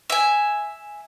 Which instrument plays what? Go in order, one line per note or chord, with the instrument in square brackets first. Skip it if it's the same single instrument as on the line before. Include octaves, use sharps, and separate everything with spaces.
[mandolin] E5 G#5